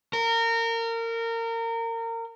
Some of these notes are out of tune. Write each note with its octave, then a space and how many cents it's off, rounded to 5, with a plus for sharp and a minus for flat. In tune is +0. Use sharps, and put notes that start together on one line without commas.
A#4 -25